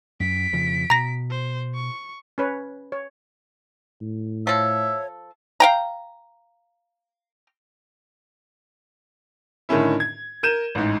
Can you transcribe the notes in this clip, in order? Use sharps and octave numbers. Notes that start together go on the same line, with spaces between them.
F#2 B6 D7
F2 C#3 F3
B2 A#5 A#6
C5
C#6
C#4 B4 C#5
C#5
A2
F3 A4 C#5 E5
F5 G5 A#5
A2 D3 D#3 C#4 E4
G#6
A#4 G6 D#7 E7
A1 G#2